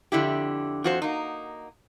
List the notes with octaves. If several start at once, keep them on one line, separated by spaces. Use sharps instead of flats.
F2 D3 E4 G4
F2 F#4 C5
A#3 D#4